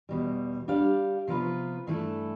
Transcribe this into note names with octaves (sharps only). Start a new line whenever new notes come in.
E2 B2 G3
G3 D4 G4 D5 F5
C3 F3 B3 F4 B4
G2 E3 A3 E4 A4